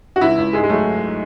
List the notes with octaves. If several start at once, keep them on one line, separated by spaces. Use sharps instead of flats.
F#4
C#2 E4
C#2
G#2 G#3
G#3
F#3 A3